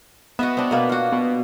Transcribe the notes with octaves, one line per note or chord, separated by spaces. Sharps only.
B3 F#4 D#5 E5
C4 D4
B2 A#3
F4 F#4
B2